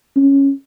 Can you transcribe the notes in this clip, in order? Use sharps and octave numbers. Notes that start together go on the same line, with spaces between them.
C#4